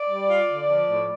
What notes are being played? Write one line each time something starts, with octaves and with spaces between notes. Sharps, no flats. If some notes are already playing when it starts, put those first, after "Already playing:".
Already playing: D5
G3
F4
D3
F3
A2